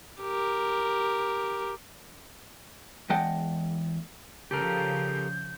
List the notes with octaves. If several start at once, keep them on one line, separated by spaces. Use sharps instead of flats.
G4 A#4
E2 G#3 D#5 F#5 G5 A5
C#3 F3 G4 A4 A#4 G6